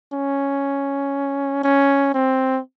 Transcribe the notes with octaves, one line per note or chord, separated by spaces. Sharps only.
C#4
C#4
C4